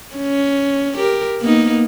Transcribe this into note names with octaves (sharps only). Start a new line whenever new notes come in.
C#4
G4 A#4
A#3 B3 D#4